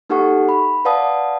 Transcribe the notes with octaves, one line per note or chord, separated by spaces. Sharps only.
A#3 D#4 G4 A4 F#5 C#6
B5
B4 D5 F5 F#5 A5 D#6